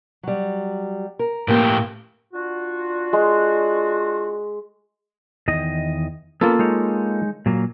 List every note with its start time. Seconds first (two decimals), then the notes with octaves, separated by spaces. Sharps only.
0.23 F#3 G3
1.19 A#4
1.48 A2 A#3 G4
2.34 D4 F4 F#4
3.13 G#3
5.48 E2 D#3 D#5
6.41 A#3 B3 C#4 F4 A4
6.59 G#3 D#4 C#5
7.46 A#2 F#3 A#3